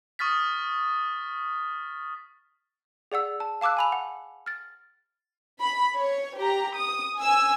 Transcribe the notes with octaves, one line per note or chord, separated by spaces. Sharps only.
C#6 D#6 F6 A6 B6
G#4 D5 F#5 E6
A5
F5 A5 D6 E6 F#6
G#5 B5 F7
F#5
F6 A6
B5
C#5
G4 A#5
D#6
G#5 E6